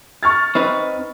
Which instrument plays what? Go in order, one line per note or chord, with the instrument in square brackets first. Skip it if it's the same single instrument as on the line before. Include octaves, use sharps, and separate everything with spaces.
[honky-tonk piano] C#6 F6 A6
[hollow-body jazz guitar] C4 D#4 B4